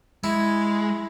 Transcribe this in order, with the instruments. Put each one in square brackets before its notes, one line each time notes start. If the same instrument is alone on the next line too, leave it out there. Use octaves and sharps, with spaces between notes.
[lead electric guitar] G#3 [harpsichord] E4